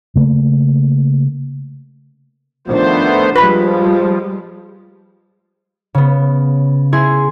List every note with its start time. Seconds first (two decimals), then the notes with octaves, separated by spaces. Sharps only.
0.16 C#3 A3 A#3
2.67 D#3 F3 A3 B3 D4 C5
3.36 F3 G3 G#3 F4 B4 B5
5.94 C#3 B3
6.92 E4 G#4 G#5 C6